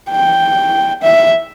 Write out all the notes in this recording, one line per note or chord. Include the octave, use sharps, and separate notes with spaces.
G5
E5